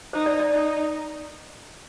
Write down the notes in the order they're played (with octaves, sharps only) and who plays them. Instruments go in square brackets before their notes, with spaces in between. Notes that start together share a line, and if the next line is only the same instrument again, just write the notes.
[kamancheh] D#4 [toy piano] C5
[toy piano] D5
D5
[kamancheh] D#4